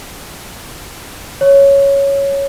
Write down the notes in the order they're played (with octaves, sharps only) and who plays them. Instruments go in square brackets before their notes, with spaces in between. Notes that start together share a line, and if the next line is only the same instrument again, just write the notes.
[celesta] C#5